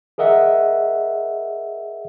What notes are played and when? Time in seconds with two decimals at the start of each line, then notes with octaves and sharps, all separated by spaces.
0.18 G#4 A#4 D#5 E5 F#5